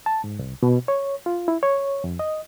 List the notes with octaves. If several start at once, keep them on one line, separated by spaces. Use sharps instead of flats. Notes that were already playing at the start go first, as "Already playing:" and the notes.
A5
G#2
C2
B2
C#5
F4
E4
C#5
F2
D#5